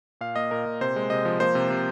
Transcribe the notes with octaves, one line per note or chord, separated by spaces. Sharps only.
A#2 F5
A#3 D#5
A#2 A#4
A#2
C3 C5
G#3
C3 D#5
F3
A#3 C5
C3
C3